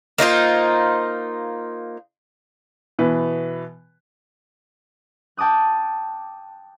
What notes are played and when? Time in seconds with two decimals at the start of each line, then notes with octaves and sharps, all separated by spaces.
0.18 A#3 D#4 F4 C5
2.99 B2 E3 B4
5.37 G5 A5 D6 D#6 F#6